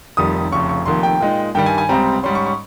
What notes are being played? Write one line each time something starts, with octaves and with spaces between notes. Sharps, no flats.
F1 F2 D#3 G3 D#6
F1 F2 C#3 C#6
C#6
F1 F2 D#3 A#3 C6
G5
A#2 G#3 D#4
G2 D#3 G3 G5
G#5
G#5
C#2 C3 G3 C4 A#5
G#2 G3 C#4 C6
C#6
C#6